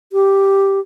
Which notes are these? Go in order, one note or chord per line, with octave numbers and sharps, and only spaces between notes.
G4